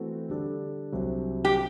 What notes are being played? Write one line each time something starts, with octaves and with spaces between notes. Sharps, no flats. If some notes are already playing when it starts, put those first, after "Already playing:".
Already playing: E3 A3 C4 F#4 A4
D3 G3 D4 A4
C2 C3 F#3
G4